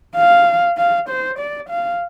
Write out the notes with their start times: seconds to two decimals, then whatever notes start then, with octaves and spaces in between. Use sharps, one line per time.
0.16 F5
0.78 F5
1.09 C5
1.39 D5
1.69 F5